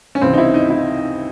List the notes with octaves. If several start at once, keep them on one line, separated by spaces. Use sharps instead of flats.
C#4
C#2 C3 E3 C4
D#4
E4
D#4
E4